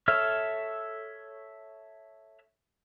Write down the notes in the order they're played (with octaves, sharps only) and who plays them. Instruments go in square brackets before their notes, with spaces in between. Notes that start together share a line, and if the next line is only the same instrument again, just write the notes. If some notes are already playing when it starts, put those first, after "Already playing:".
[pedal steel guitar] A4 C#5 E5 F6